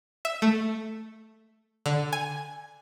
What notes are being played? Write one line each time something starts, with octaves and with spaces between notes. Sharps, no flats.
E5
A3
D3
G#5